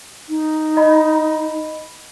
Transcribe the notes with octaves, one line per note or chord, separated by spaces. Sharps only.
D#4
D#5 B5